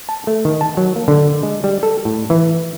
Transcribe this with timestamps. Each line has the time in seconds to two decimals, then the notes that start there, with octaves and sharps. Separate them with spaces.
0.09 A5
0.27 A3
0.45 D#3
0.61 A5
0.77 F#3
0.96 A#3
1.08 D3
1.43 G#3
1.64 G3
1.83 A4
2.05 A2
2.30 E3